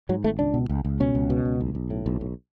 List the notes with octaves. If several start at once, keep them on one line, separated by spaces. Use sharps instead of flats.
G#2 F#3
G#1 A3
C#2 D4
B2
C#2
C#2
B2 C#4
C#2
B2
C#2
B1
B1
A2
B1
B1